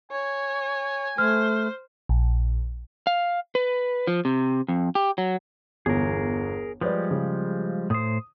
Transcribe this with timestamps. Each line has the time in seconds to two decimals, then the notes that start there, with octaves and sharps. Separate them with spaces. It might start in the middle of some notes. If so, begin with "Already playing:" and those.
0.12 C#5 G#5
1.18 A3 C5 F6
2.09 A#1
3.07 F5
3.55 B4
4.07 F3
4.25 C3
4.68 F2
4.95 G4
5.18 F#3
5.86 G1 E2 G#4 A#4
6.81 F3 G3 G#3 B4 D5
7.11 C#3
7.90 A2 C5 D#6